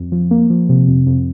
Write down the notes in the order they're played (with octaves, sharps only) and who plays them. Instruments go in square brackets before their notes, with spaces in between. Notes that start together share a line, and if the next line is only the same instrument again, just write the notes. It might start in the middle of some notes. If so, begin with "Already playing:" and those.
Already playing: [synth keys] F2
F3
A#3
F3
C3
F2
F2